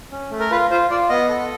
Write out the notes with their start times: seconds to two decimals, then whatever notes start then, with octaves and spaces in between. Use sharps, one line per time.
0.12 C#4
0.31 A3
0.40 A#4
0.51 F4 B4
0.71 F4 C5
0.90 F4 D5
1.09 B3 D#5
1.29 A4